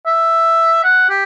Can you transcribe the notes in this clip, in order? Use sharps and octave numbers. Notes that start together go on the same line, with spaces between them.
E5
F#5
G4